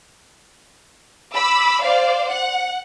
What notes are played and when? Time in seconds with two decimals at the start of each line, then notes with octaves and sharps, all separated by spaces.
1.34 B5 D6 E6
1.82 C5 D5 F5
2.29 F#5